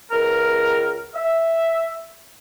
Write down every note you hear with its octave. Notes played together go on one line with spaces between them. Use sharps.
C#2 A#4
E5